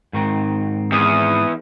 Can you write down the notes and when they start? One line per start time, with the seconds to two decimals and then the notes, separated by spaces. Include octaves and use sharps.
0.13 G#2 D#3 C4
0.92 E2 D#6